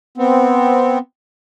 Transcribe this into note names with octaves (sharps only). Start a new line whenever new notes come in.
B3 C4